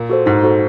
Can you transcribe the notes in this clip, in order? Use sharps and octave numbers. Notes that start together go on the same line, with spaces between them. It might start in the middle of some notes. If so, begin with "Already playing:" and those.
Already playing: A#2
F#4 A4 C5
G#2 D#4
F#4 A4 C5